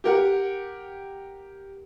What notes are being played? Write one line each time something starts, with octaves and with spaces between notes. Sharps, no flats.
G4 A#4 F#5